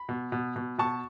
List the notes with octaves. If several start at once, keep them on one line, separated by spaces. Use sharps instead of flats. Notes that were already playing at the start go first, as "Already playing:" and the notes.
Already playing: B5
B2
B2
B2
B2 A5 C#6